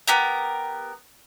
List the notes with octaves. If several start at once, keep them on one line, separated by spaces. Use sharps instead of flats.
B3 G4 A#4